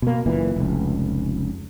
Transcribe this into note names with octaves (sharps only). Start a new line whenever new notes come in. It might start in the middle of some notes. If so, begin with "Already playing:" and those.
B2 A#3
F#1 A#2 E3
F1 C#2